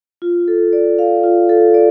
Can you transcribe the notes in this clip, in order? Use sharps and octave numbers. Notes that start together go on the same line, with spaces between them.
F4
A4
D5
F5
F4
A4
D5